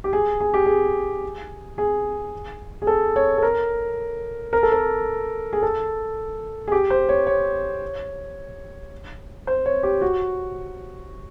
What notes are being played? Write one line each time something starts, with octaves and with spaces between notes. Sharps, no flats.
G4
G#4
G#4
G4
G#4
G#4
G#4
A4
C#5
A4
A#4
A#4
A4
A#4
G#4
A4
G#4
G4
C5
C#5
C#5
C5
C#5
G4
F#4